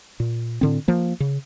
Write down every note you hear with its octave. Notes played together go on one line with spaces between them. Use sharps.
A#2
A2 D3 C4
F3 A#3
C#3